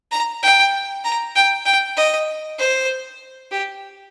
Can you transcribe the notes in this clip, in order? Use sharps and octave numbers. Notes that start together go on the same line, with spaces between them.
A#5
G5
A#5
G5
G5
D#5
C5
G4